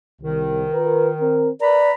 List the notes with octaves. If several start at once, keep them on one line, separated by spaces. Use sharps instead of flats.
C2 D#3
F4 A#4 B4
C4 A#4
A#4 B4 D5 A#5 B5